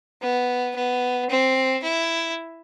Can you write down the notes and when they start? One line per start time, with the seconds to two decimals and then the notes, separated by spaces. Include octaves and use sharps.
0.22 B3
0.75 B3
1.29 C4
1.83 E4